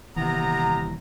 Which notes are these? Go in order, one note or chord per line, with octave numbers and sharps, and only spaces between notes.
D#1 D#2 C3 E3 B3 A#5